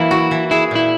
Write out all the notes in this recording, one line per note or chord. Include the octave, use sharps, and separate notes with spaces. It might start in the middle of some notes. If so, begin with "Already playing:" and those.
Already playing: E3 F#3 A#3 E4
F#4
E3
E4 G#4
A#2 E4